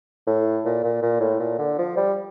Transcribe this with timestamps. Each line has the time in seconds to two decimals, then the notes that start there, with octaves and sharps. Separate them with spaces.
0.27 A2
0.65 A#2
0.84 A#2
1.02 A#2
1.21 A2
1.40 A#2
1.59 D3
1.78 F3
1.97 G3